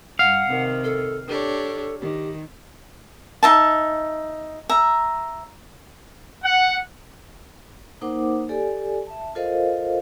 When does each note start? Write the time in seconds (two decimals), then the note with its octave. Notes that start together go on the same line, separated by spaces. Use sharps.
0.19 G2 F5 F#5
0.48 C3 D#3
0.84 A4
1.29 D4 G4 A4 C#5
2.01 D#3 G4
3.43 D#4 E5 A5
4.69 E5 A#5
6.44 F#5
8.01 A#3 D#4 A#4 C5 F#5 D6
8.49 G4 A4 D5 G#5
9.07 E5 A5
9.35 F4 A4 A#4 C5 D#5 F5